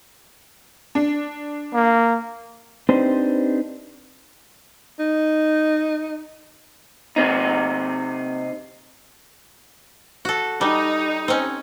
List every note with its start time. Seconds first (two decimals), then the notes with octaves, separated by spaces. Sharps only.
0.95 D4
1.74 A#3
2.89 C4 D4 D#4 G4 B4 C5
4.99 D#4
7.16 C3 C4 D#4
10.25 F#4 A4
10.61 G3 D#4
11.28 C4 C#4